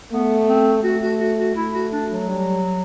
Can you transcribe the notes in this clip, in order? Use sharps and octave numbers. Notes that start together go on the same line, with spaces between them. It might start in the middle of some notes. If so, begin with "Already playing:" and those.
A3 B3
C4
A3 F#4
F#4
F#4
F#4
A3 E4
F#4
D4
F#3
G3